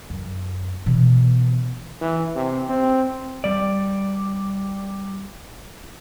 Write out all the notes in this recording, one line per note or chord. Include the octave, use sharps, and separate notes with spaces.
F#2
B2 E3
E3
C3
C4
G3 D5